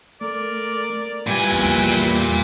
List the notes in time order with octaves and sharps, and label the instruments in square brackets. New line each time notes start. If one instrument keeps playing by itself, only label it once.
[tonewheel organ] A3 [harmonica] A#4 D5
[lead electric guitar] A#2 G#5 [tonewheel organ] G3 [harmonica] E4 B4 G5
[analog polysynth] A#1 E2